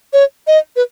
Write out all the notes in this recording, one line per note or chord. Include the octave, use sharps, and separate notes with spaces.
C#5
D#5
B4